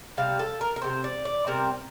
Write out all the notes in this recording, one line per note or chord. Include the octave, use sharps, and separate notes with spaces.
C3 G3 C4 F5
A4
A#4
A#4
C3 G3 C4 C5
D5
D5
C3 G3 C4 A#4